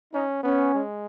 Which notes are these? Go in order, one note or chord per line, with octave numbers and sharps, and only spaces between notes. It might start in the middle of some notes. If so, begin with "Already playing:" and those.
C#4 D#4
B3 C#4
G#3